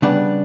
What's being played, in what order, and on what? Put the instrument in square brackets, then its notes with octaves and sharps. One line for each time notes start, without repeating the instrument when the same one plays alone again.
[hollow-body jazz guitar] C#3 G3 B3 D4 D5